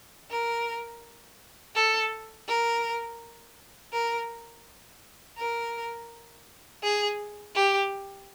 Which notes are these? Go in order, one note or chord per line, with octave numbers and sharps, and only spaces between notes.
A#4
A4
A#4
A#4
A#4
G#4
G4